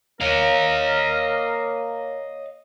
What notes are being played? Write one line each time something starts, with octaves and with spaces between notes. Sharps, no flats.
A#3 A#4 C#5 D#5 F5